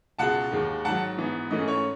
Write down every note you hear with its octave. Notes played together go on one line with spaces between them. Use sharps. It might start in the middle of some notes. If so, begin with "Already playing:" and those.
C#2 B2 G#3 F#5 A5
D#2 D#3 G#3
G#2 D#3 F#3 F#5 A5
G#2 E3 B3
G#2 E3 A3 C#4 D#5
C#5